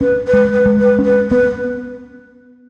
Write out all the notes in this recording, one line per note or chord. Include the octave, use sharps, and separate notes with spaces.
C#4 B4
B4
G#3
B4
G#3
B4
C#4
B4
B3 B4